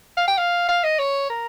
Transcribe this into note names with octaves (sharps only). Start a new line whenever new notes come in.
F5
G5
F5
F5
D#5
C#5
A#4